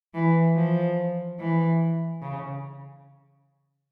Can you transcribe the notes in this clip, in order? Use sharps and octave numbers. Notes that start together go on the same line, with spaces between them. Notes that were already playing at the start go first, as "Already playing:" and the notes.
E3
F3
E3
C#3